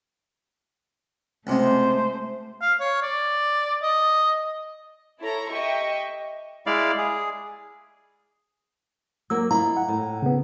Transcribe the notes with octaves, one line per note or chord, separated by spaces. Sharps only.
C#2 C3 G#3 A3 C5
F5
C#5
D5
D#5
E4 A4 C#5 A#5
G4 D#5 E5 G5 C#6
G#3 E4 D5 F5
G#4
F#3 A#3 E6
E4 F4 D#5 A#5
F#5
A2
C#3 B3